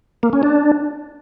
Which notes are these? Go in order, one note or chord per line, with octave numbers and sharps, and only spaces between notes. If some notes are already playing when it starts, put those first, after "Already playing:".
A#3
C#4
D4